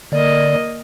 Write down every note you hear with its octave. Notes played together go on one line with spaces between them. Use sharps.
D3 A#3 D5 D#5